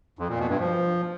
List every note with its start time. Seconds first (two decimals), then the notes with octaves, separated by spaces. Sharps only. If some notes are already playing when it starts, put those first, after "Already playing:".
0.19 F2
0.29 A#2
0.39 B2
0.49 G2
0.59 F3